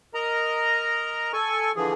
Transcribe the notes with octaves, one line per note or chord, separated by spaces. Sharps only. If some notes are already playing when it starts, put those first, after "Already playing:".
A#4 D#5 A#5
A4 G#5 C#6
D3 E3 F3 G#4